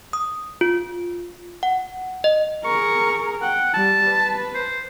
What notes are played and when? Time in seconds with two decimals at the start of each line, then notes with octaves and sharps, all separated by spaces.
0.13 D#6
0.61 F4
1.63 F#5
2.24 D#5
2.65 G#4 A#4 C#6
3.42 F#5 G5
3.74 G3 A5
4.04 B4
4.55 C5